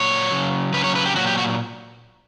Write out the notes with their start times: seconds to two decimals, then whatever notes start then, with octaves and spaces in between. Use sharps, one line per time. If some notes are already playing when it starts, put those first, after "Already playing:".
Already playing: A#2 F#3 C#5
0.31 C#3 F#3
0.74 C#3 F#3 B4
0.84 C#5
0.95 B4
1.05 G4
1.16 A#2 F#3 F#4
1.27 G4
1.38 F#4